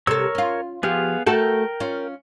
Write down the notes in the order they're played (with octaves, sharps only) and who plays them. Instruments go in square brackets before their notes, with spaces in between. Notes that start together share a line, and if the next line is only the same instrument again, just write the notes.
[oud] C3 A4 [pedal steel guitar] A#4 C#5 E6
[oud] C#4 F4
[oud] F3 G4 [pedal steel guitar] B3 G#4 F5
[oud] A3 F#4 A4 [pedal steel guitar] A#4 G5
[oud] C#4 F4